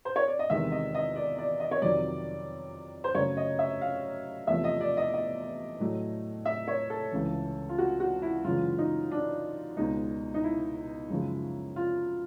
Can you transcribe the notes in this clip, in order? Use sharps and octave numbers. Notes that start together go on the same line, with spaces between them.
C5
C#5
D5
D#5
E2 C3 D#3 G#3 E5
D#5
D#5
D5
D5
D#5
C#5
F2 C3 D#3 F#3 D5
C5
F#2 C#3 F#3 A3 C#5
D#5
E5
F5
E2 C3 F3 A3 E5
D#5
D5
D#5
D#5
A2 F#3 A3
E5
C#5
A4
C#2 C#3 E3
F4
F#4
F#4
E4
F#2 C#3 E3 G#3 F4
D#4
D4
C#2 B2 G#3 D#4
D#4
E4
F#2 C#3 F3 G#3
F4